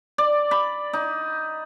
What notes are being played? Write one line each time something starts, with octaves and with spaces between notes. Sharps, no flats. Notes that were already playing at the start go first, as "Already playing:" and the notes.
D5
B5
D#4